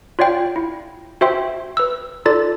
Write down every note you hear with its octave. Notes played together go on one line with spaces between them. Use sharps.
F4 C#5 D5 F5 G5
E4
F#4 C5 E5 G5 C6
B4 E6
D#4 F4 A4 D5 A6